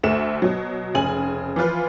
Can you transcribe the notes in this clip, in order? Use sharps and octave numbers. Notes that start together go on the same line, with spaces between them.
D2 A3 E5 E7
B2 F#3
F1 C#3 G#5 F#7
E3 F3 F4 B4